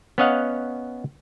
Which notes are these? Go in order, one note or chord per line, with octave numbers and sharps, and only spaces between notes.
B3 C#4 C#5 D#5 F5 F#5